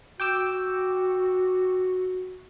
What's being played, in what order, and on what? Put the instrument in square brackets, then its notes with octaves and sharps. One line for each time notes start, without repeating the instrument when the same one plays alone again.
[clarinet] F#4 [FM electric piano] G5 D6 E6